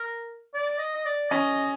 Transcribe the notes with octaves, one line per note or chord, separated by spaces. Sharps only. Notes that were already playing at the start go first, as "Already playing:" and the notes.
Already playing: A#4
D5
D#5
D#5
D5
C#4 D#5